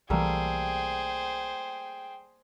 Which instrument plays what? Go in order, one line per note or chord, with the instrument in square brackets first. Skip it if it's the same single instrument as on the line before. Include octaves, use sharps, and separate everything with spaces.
[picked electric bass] B1 E3 [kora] G3 A3 A#3 [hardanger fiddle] G#4 C5 [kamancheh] G5